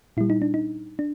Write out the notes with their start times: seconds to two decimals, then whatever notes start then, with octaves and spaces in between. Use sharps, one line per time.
0.17 A#2 G3 E4
0.30 D#4
0.42 D4
0.54 D#4
0.99 D4